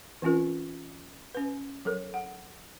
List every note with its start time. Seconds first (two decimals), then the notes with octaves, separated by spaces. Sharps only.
0.22 E3 C4 C#4 F4 A#4
1.35 C#4 B4
1.85 F#3 A4 A#4
2.14 F#5